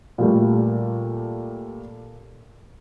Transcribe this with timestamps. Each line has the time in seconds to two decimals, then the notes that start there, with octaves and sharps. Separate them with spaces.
0.18 A#2 G3 A3